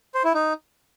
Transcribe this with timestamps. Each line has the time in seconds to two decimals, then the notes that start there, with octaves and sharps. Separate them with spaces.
0.14 C5
0.24 E4
0.34 D#4